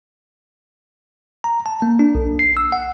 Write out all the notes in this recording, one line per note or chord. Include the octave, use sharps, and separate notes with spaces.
A#5
A5
A#3
D4
B1
C7
E6
F#5